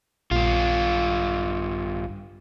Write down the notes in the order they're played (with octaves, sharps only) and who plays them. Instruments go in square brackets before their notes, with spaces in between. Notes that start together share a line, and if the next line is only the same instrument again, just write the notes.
[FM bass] A#1 [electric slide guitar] G2 F4